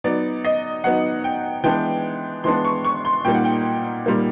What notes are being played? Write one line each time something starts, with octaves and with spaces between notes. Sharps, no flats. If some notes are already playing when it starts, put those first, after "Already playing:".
F#3 B3 D#4 D5
D#5
F#3 B3 D#4 F#5
G5
E3 G#3 B3 D4 G5
E3 G#3 B3 D4 C6
C#6
C#6
C6
A#2 G3 A#3 D#4 G5
F#5
G5
A#2 G3 A#3 D#4